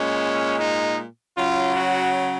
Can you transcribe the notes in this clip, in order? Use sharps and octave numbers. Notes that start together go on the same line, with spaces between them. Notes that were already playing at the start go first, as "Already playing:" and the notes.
Already playing: A#2 G#3 C#4
D#4
C#3 F#3 F4
F#4